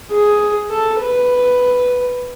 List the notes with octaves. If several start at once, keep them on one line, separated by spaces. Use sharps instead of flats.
G#4
A4
B4